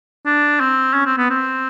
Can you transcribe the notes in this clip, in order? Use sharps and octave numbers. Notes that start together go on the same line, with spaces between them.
D4
C4
C#4
C4
B3
C4